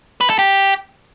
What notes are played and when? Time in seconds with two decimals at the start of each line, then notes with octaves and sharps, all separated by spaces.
0.21 B4
0.30 A4
0.39 G4